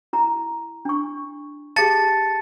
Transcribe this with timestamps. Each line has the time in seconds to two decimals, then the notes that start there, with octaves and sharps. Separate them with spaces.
0.13 E4 A#5
0.85 D4 C#6
1.76 G4 G#4 F5 A5 A6 C#7